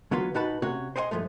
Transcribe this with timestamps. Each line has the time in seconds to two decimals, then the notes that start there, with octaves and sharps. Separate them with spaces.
0.11 D3 F#3 B3 F4 B4 C6
0.34 A#2 D#4 F#4 B4 A5 B5
0.62 C3 C#4 F#4 C#5
0.96 C5 D5 D#5 F#5 G#5 C6
1.11 G2 D#3 F3 G#3 A3